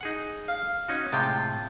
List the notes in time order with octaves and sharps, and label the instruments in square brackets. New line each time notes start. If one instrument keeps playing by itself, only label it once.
[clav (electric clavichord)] D#4 G#4 F#5
[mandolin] F5
[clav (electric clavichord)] C#4 D#4 F#4
[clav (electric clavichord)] A2 C3 G#3 [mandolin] F4 G5